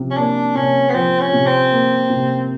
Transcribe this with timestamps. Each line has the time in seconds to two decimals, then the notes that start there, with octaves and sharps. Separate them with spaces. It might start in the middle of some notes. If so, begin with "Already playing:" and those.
Already playing: C3 F3
0.11 C#4
0.17 A#3 D4
0.55 C3 C#4
0.89 B3
0.94 F3 C4
1.20 C#4
1.33 C3
1.46 C4
1.71 A#3
2.10 C3